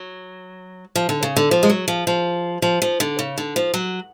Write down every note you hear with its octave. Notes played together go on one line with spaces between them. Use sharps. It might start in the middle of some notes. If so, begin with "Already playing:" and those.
Already playing: F#3
F3
D3
C#3
D3
F3
G#3
F#3
F3
F3
F3
F3
D3
C#3
D3
F3
F#3